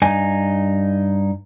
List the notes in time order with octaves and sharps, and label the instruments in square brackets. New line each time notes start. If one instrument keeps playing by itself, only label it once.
[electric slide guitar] G2 D#4 G#5